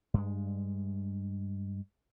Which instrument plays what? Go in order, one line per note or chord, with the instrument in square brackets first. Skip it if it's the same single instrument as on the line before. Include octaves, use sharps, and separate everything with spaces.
[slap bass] G2 G#3